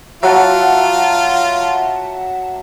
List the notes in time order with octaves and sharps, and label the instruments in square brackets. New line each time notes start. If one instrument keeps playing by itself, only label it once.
[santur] F#3 [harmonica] F4 [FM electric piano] E5 F#5 A5